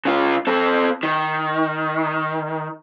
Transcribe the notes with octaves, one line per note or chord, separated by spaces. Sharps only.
C#3 F4
C4 A4
D#3